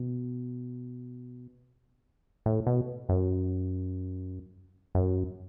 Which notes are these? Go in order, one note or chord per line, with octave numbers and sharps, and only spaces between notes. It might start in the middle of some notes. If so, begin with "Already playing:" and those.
Already playing: B2
A2
B2
F#2
F#2